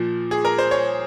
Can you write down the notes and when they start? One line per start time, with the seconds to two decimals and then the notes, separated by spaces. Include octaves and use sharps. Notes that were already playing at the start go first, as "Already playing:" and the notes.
Already playing: A#2 F3
0.31 G#4
0.45 A#4
0.58 C5
0.71 C#5